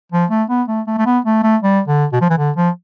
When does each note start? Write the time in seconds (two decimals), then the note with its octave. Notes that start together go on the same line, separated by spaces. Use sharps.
0.12 F3
0.30 A3
0.50 B3
0.68 A3
0.87 A3
0.98 A3
1.06 B3
1.25 A3
1.43 A3
1.63 G3
1.87 D3
2.13 B2
2.21 F3
2.30 E3
2.38 D3
2.56 F3